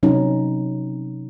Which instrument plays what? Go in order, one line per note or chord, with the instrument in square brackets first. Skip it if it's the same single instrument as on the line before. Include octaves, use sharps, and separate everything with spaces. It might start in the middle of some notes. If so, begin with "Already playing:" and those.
[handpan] C3 F#3 C#4 D#4